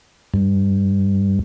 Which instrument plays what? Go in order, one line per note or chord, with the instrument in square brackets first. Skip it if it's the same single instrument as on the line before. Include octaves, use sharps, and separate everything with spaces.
[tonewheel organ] G2